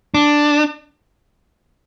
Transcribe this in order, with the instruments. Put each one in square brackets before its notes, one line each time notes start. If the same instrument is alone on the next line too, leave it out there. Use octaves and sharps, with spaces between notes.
[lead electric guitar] D4